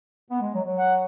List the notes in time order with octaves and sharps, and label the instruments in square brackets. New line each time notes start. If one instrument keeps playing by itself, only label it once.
[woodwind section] B3
G#3
F#3
F#3
[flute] F#5